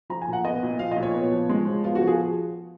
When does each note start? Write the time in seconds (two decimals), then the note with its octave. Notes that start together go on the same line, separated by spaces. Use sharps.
0.10 F3 A#5
0.22 G#5
0.27 A#2
0.33 F#5
0.44 B3 D#5
0.63 A#2
0.79 F3 F5
0.91 A#2 D#5
1.03 C#5
1.14 B3
1.32 F3
1.49 G#3
1.66 F3
1.84 B3 F4
1.95 F#4
2.01 F3
2.07 G#4